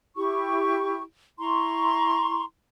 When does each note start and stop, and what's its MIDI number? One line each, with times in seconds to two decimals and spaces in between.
0.16 1.02 64
0.16 1.02 67
0.16 1.02 85
1.39 2.43 64
1.39 2.43 82
1.39 2.43 84
1.39 2.43 85